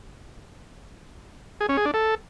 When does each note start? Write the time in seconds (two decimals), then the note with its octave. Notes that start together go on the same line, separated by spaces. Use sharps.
1.61 G#4
1.69 C#4
1.77 G#4
1.85 D4
1.94 A4